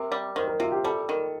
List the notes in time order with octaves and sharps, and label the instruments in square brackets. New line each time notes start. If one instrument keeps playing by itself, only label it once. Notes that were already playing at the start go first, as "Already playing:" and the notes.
Already playing: [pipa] C3 [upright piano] A#4
[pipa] G3
[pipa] D#3 [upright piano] C5
[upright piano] A#4
[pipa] C3 [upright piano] F4
[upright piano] G4
[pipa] G3 [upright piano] A4
[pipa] D#3